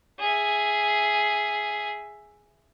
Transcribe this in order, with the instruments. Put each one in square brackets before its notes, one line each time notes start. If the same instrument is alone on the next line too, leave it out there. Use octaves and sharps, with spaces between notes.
[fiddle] G#4 E5